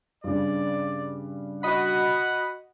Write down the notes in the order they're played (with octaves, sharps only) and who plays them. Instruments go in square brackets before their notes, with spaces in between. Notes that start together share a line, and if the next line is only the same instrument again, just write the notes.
[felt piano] G2 C#3 [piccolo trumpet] D5
[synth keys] F#4 D#5 B5 [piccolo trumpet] F#5